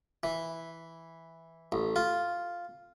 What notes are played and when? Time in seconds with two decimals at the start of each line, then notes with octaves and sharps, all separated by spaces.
0.23 E3
1.72 A1
1.96 F4